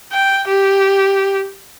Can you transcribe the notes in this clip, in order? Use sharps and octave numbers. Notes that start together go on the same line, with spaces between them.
G5
G4